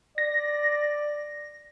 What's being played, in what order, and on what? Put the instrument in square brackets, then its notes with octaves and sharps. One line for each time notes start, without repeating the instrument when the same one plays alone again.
[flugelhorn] D5 [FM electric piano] A#6